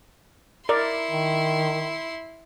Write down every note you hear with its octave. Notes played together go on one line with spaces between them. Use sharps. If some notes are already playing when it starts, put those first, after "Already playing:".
E4 A#4 D5 C6
D#3